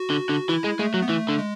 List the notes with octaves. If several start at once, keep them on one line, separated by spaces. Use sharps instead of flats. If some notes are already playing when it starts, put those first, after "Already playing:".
Already playing: F#4
D3
D3
E3 E4
G#3
G#3 A3
F#3
B3
E3 A3
D3
G#3